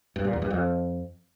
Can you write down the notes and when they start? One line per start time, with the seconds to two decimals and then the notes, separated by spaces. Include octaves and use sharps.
0.16 G2
0.24 A#2
0.33 E2
0.42 G2
0.50 F2